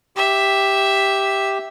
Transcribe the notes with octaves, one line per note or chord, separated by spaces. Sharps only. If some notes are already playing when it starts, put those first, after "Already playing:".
G4 E5